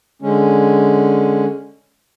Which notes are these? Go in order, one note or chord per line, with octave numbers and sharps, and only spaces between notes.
D3 G#3 C#4